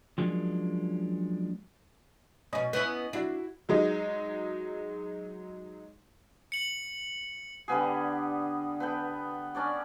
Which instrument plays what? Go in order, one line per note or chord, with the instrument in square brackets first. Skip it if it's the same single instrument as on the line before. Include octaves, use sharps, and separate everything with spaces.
[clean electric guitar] F3 F#3 G#3 A#3 C#4 D4
[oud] B2 C#4 [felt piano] D#5
[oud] B3 C#4 E4
[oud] D4 [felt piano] E4 F#4
[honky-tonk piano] F#3 G#3 D#4
[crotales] C#7 F#7
[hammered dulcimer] D3 G3 B3 G#4
B3 A4 G5
C#4 D4 C#5 D5